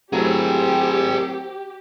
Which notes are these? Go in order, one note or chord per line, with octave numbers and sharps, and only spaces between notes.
F#3 A3 C4 E4 G4 G#4 A#4